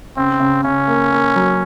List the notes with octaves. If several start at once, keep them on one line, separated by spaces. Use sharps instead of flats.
C#3 C4
C#3
C#3 C#4
A#3
A#3
F#3